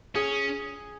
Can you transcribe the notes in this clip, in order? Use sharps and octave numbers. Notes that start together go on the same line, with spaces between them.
C#4 G#4